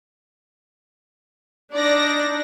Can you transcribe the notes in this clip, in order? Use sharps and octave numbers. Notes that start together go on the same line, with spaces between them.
D4 D#4 D5 A#6